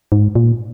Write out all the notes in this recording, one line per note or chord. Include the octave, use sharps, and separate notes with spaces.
G#2
A#2